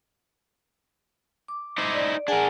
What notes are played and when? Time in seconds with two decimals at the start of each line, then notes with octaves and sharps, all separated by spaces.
1.48 D6
1.78 D#4 E4 C5
1.93 D5
2.28 D4 G#4 A#4 F#5 G#5